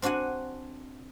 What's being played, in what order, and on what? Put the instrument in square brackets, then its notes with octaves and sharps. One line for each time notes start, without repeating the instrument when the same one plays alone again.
[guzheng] C4 D4 F#4 F#5 G#5